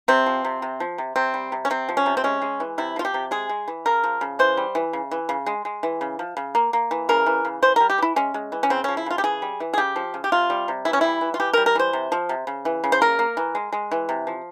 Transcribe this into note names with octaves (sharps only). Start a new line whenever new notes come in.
C3 C4
F3
C3
C3
F3
C3
C3 C4
G3
C3
C#4
C3 C4
F3
C#4
C3
C4
G#3 C#4
G#3
E3
C3 E4
F3 F4
G4
C3
G#3 G#4
G#3
E3
C#3 A#4
F3
C#3
E3 C5
G3
E3
C#3
E3
C#3
G#3
G#3
E3
C#3
F3
C#3
A#3
A#3
E3
C#3 A#4
E3
C#3
E3 C5
G3 A#4
G4
E3 E4
G#3 C#4
G#3
E3
C#4
C#3 C4
F3 C#4
E4
C#3 F4
G4
E3 G#4
G3
E3
G#4
C#3 G4
F3
C#3
G4
C3 F4
G3
C3
E3 E4
C#4
G3 E4
E3
F4
E3 G4
A#4
G3
A#4
E3 C5
C3
F3
C3
C#3
E3
C#3
C5
A#3 A#4
A#3
E3
G#3
G#3
E3
C3
F3